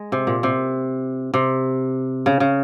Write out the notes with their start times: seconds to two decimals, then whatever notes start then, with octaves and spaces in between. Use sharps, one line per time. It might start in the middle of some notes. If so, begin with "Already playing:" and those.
Already playing: G#3
0.12 C3
0.27 A#2
0.43 C3
1.34 C3
2.26 C#3
2.40 C#3